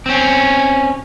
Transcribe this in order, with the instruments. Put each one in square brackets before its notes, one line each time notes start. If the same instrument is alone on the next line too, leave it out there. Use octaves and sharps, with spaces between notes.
[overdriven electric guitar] C4 C#4